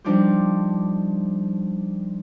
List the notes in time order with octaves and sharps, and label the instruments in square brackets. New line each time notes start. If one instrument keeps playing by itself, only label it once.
[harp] F3 G3 D4 D#4 F4 G4